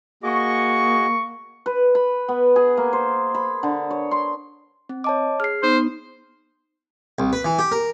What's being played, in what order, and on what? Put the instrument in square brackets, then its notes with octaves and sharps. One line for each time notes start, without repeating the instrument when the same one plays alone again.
[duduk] A#3 [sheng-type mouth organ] F#4 G#4 D#5 [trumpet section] C#6
[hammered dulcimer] B4
B5
B3
G#4
A#3
C5
B5
D3
C#5
C6
[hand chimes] C4
[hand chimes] C#5 A5 D6 [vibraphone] D#5
[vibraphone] G#4 [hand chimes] F6 C7
[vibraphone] B3 D#4 [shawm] C5
[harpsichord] C2
B4
E3
G4
A#4